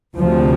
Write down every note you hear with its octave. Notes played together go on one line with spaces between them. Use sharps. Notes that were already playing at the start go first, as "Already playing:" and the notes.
D2 C3 F3